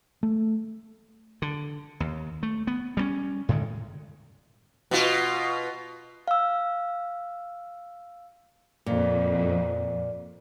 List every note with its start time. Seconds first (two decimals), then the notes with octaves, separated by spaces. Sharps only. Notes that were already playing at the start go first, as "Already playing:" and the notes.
0.23 A3
1.42 D3
2.00 D#2
2.43 A3
2.67 B3
2.97 G3 G#3 C#4
3.49 A2 D3 D#3 G#3
4.91 B2 F4
6.28 F5 E6
8.86 F2 A#2